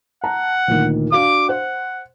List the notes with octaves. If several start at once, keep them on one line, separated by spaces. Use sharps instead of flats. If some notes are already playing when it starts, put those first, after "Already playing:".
F#5 A5 A#5
D2 A#2 D#3
D4 F#4 F5 D6
C5 F#5